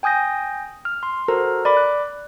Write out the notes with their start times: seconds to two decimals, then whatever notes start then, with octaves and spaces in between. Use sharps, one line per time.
0.03 G5 G#5 D#6 G6 A#6
0.85 F6
1.03 C6
1.28 F#4 A4 A#4 C5 A#5
1.65 D5 B5 D6
1.77 F#6